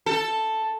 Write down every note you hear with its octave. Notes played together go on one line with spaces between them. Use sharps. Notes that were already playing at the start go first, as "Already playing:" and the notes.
A4